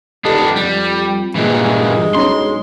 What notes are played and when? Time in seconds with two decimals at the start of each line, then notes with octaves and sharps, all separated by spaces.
0.25 D#1 B3 D4 G4 A4 D#5
0.56 F2 G3
1.35 G2 A#2 E3 G#3
2.15 B1 C#4 D4 C#5 C6